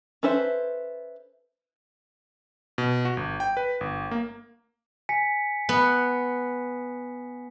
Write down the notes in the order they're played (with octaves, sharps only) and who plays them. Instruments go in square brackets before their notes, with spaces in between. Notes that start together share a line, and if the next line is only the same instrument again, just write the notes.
[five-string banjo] C#4 A4 B4 C5 E5
[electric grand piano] B2
F#4
G1
G5
B4
G1
A#3
[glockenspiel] G#5 B6 C#7
[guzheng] B3